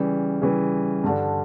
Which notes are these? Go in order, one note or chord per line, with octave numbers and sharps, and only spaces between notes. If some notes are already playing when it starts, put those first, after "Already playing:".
Already playing: C#3 E3 G3
C#3 E3 G3
G2 D3 G3